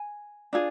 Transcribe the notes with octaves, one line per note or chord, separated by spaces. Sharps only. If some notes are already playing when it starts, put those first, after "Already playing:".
Already playing: G#5
D4 F4 G#4